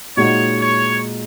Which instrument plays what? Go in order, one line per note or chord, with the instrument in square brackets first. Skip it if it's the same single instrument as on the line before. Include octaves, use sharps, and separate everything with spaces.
[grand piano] A#2 G#3 D#4 F#4 [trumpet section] C#5
[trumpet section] C#5